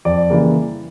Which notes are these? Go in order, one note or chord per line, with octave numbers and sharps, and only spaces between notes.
F2 D5
C#3 E3 G3 A#3